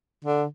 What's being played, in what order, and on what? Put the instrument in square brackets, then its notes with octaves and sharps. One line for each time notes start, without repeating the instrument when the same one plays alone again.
[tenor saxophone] D3